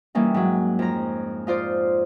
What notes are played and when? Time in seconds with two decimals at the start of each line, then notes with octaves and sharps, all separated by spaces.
0.15 E3 G3 A#3 C#4 D#4
0.34 G#2 F#3
0.79 F2 A#5
1.47 D#4 F4 C5 D5